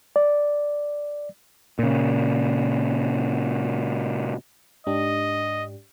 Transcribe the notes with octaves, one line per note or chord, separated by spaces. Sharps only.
D5
A#2 C#3
G#2 D4 G4 D#5